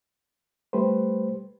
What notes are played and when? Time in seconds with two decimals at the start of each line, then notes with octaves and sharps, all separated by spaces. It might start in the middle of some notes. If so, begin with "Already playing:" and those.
0.73 G3 A3 G4 B4 C5